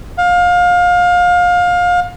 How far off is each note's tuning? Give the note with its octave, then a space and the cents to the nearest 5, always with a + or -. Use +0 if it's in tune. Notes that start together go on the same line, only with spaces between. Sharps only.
F5 +25